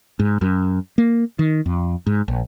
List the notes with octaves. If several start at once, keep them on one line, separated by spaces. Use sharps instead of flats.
G#2
F#2
A#3
D#3
F2
G#2
A#1